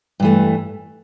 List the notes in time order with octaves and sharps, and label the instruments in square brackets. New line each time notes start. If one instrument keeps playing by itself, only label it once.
[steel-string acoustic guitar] G2 E3 A3